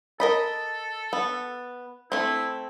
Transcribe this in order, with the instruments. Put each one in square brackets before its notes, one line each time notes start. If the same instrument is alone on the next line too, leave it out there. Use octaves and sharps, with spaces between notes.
[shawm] A4 [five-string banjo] A#4 D#5 B5
[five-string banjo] B3
[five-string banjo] A3 C4 [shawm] E4